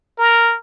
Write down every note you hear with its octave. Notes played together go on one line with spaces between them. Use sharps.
A#4